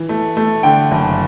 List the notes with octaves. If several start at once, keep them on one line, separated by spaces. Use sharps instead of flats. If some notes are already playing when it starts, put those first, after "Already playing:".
Already playing: E3
A3
A3
D3 G5
F#1